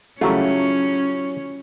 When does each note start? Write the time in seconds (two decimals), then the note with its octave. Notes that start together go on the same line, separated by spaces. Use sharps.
0.21 C#3 F#3 G3 A3 C#4 E4 F4